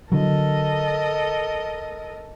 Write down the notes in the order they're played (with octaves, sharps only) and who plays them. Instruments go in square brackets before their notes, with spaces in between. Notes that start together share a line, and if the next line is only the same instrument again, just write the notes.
[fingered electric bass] D3 F#3 [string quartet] A4 A#4 D#5